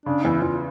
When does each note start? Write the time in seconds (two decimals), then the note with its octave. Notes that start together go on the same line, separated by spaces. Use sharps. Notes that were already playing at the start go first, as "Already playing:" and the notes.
0.06 C#3 D4
0.25 E2 E4
0.42 E2 F4